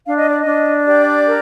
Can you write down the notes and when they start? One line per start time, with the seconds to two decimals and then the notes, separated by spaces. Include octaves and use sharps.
0.05 D4 F5
0.16 D#5
0.30 D5
0.41 D4 D#5
0.85 G4 D5
1.27 A#4